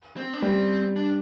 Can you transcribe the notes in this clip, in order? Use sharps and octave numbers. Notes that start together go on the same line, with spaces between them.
C4
D4
G3 C4
D4